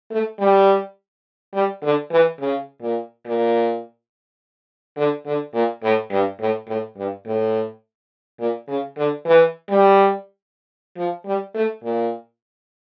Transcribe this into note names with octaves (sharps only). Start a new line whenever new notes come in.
A3
G3
G3
D3
E3
C#3
A#2
A#2
D3
D3
A#2
A2
G2
A2
A2
G2
A2
A#2
C#3
D3
E3
G3
F3
G3
A3
A#2